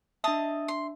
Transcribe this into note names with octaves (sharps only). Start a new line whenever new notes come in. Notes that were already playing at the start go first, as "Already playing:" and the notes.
D4 D#5 E5 A5 D#6
C6